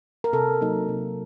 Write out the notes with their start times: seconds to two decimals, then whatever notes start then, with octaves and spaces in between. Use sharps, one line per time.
0.24 A#4
0.33 C3 A4
0.61 F#3 A#3 D#4
0.89 C3